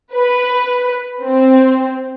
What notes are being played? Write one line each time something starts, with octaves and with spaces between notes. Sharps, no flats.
B4
C4